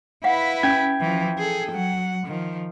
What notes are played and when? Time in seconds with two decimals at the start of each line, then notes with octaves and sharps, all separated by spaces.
0.24 E4 B4 F5 F#5
0.63 C#4 G5 G#6
1.00 E3 F3
1.39 G#4 A4
1.71 F#3 F#5
2.26 D#3 F3